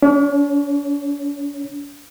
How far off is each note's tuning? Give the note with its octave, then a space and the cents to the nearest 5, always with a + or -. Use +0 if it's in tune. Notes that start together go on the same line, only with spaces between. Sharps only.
D4 -45 C#5 +0